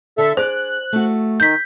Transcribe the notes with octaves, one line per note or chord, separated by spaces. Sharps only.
D3 A4 E5
G#4 C5 D5 F#6
A3 F#4
D#3 G6 B6